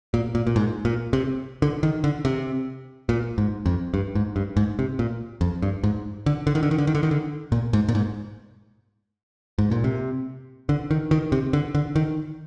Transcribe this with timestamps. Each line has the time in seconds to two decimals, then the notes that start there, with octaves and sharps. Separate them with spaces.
0.14 A#2
0.35 A#2
0.47 A#2
0.56 G#2
0.85 A#2
1.13 C3
1.62 D3
1.83 D#3
2.04 D3
2.25 C3
3.09 A#2
3.38 G#2
3.66 F2
3.94 G2
4.15 G#2
4.36 G2
4.57 G#2
4.79 C3
4.99 A#2
5.41 F2
5.62 G2
5.84 G#2
6.26 D3
6.47 D3
6.55 D#3
6.63 D3
6.71 D#3
6.78 D3
6.87 D#3
6.95 D3
7.03 D#3
7.11 D3
7.52 A#2
7.73 G#2
7.88 A#2
7.95 G#2
9.58 G#2
9.71 A#2
9.84 C3
10.69 D3
10.91 D#3
11.11 D#3
11.32 C3
11.53 D3
11.75 D3
11.96 D#3